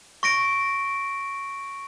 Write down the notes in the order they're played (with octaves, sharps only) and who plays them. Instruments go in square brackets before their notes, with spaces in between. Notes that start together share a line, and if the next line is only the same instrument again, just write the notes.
[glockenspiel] C#6 A#6 D7